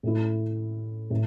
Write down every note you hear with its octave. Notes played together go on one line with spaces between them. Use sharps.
A2 A3 E4
A2